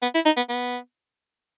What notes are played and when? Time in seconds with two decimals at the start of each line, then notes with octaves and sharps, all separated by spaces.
0.02 B3
0.14 E4
0.25 D#4
0.37 B3
0.49 B3